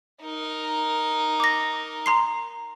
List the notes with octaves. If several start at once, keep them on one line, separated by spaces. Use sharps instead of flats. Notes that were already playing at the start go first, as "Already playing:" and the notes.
D#4 A#4
D6 A#6
A#5 C6 C7